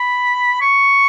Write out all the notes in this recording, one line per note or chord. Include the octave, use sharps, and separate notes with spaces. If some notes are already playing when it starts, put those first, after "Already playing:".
Already playing: B5
C#6